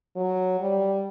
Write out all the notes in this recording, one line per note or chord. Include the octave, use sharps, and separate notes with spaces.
F#3
G3